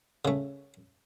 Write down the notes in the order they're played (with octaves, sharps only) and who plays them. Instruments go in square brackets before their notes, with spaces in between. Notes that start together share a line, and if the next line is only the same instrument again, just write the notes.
[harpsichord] C#3 A3